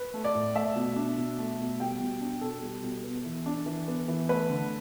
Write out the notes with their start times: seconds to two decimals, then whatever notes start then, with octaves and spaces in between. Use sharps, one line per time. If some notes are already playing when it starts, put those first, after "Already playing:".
Already playing: B4
0.14 A3
0.24 D5
0.35 A2
0.55 A3 E5
0.76 B2
0.96 D4
1.17 B2
1.38 A3
1.59 B2
1.80 G3 G5
2.00 B2
2.21 D4
2.41 B2 A4
2.63 G3
2.83 B2
3.04 B3
3.25 E3
3.46 D4
3.66 E3
3.88 B3
4.08 E3
4.28 A3 B4
4.50 D3